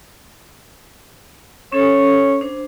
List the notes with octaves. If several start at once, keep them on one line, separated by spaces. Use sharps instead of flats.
C#4 A4 C#5
D4 C5